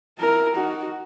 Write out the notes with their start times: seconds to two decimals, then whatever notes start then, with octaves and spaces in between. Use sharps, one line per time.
0.18 E4 A#4
0.55 D#4 F#4